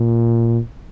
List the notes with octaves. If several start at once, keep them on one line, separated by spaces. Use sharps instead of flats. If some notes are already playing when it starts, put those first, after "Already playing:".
Already playing: A#2